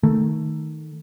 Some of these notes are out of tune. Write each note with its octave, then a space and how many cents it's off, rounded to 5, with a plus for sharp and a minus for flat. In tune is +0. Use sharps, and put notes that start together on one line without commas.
D#3 +0 A3 +0